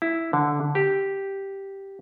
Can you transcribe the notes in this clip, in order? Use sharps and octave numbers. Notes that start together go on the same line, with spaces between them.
E4
D3
G4